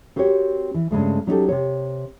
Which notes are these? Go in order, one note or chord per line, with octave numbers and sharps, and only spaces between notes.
C4 F#4 G4 A#4 C#5
E3
G2 C#3 G#3 A3
F#3 C#4 D#4 F4 G4 A4
C3 C4 C#5